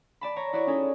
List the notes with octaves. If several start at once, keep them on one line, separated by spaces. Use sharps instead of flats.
D5 A5 B5
C#5 A#5
E4 F#4 C#5 D5
C#4 D#4 G#4 A4